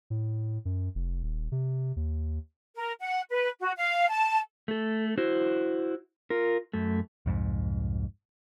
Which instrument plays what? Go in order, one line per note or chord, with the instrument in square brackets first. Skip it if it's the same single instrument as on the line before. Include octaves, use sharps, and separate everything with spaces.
[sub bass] A2
F#2
F1
D#1
C3
D#2
[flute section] A#4
F#5
B4
F#4
F5
A5
[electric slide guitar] A3 A4
E4 F#4 C5
F4 A#4
F#2 A3
[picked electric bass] C2 F2 G#2